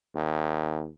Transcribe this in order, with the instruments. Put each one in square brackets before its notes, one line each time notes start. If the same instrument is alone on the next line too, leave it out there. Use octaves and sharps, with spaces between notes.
[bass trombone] D#2